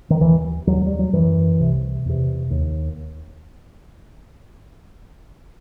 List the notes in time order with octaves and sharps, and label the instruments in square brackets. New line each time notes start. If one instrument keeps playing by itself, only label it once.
[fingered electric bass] D#3
D#2 E3
D#2 F#3
G3
F#3
F#2 E3
C2 C3
E2 C3
D#2